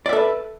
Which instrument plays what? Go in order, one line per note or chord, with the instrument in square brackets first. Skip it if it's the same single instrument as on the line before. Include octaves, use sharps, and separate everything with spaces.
[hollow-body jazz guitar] D5
E5
A4
B4